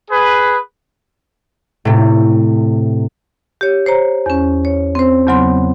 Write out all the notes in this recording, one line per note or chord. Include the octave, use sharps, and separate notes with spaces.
G#4 B4
A2 C3
G4 C#5
C5 C#5 A#5
E2 C#4
C#5
C4 C5
E2 C#3 F#3 B3 C6